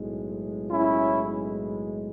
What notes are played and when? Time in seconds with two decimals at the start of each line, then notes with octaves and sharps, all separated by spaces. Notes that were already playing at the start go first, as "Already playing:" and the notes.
Already playing: B1 A2 G#3
0.70 C#4 E4